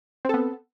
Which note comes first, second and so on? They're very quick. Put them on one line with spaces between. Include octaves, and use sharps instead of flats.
C4 A4 B3